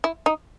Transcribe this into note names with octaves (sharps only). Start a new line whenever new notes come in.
E4
D#4